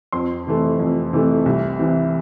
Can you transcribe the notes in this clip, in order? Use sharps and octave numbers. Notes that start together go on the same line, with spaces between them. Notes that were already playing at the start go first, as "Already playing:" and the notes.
F2 C6
C3 E3 A3
F2
C3 E3 A3
C2
C3 E3